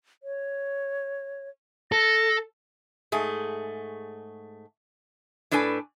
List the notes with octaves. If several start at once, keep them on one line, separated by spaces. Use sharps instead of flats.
C#5
A4 A#6
G#2 A3 G#4
A2 D4 A4 B4 G#5